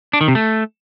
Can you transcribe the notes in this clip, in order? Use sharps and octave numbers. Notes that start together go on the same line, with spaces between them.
D4
D#3
C3
A3